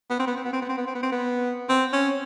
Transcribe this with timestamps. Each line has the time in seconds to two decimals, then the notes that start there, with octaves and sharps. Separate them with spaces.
0.10 B3
0.20 C4
0.27 B3
0.37 C4
0.45 B3
0.53 C4
0.62 B3
0.69 C4
0.78 B3
0.87 C4
0.95 B3
1.03 C4
1.12 B3
1.69 C4
1.93 C#4